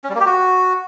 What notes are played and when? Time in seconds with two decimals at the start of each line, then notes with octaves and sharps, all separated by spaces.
0.04 C#4
0.09 G3
0.15 A#3
0.20 G4
0.26 F#4